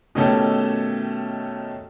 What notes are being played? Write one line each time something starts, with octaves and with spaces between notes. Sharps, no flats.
B2 D#3 A3 C#4 G4 A4